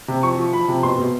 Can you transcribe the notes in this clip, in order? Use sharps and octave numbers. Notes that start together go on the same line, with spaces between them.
C3
F3 C#6
F3
F3 B5
C3
B2 C6
B2